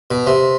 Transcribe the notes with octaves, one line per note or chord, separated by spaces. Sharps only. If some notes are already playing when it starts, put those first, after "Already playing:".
B2
C3